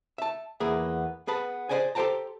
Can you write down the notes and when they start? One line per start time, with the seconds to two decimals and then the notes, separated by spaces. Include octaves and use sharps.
0.18 E5 A5
0.60 E2 A#3 B3 G#4 E5
1.27 B3 G#4 B4 A5
1.69 G#4 A#4 C5 D5 D#5 G#5
1.95 G4 A4 C5 G5 A5 A#5